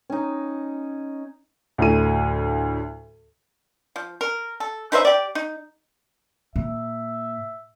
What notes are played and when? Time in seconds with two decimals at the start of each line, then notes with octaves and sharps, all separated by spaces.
0.10 C#4 D#4
1.78 D2 A2 D#7
3.96 F3
4.21 A#4
4.60 A4
4.92 D#4 B4 C5 E5
5.05 G4 D5
5.35 D#4
6.56 A#2 E5